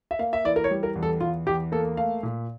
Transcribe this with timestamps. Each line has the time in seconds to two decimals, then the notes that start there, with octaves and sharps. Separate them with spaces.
0.11 E5
0.19 A#3 F5
0.33 E5
0.45 E3 D5
0.56 A#4
0.64 C#5
0.71 G3
0.83 A#4
0.95 E2
1.03 A4
1.20 E2 F4
1.46 E2 G4
1.72 A#3 A4
1.97 A3 F5
2.23 A#2